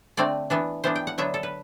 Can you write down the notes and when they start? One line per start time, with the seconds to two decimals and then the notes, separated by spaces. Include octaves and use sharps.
0.17 D3 A3 C4 D5
0.50 E3 B3 D4
0.84 E3 B3 D4 C5
0.96 G5
1.07 F#5
1.18 D3 F#3 B3 D4 E5
1.34 A4
1.43 B4